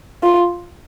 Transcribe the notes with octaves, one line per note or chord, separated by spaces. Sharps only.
F4